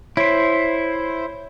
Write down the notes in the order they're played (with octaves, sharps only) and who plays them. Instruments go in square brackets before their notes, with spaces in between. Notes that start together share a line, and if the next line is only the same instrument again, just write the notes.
[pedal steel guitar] E4 C5 [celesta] C#5 B6 D7